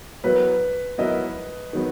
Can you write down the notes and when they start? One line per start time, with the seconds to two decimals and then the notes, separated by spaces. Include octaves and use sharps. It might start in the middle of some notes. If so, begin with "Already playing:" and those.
0.24 F#3 B3 E4 A#4 B4
0.98 F#3 B3 E4 A#4 D#5
1.73 D#3 F#3 B3